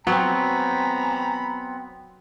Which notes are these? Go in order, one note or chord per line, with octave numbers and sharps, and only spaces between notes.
F#3 B3 C4 G#5 A#5 B5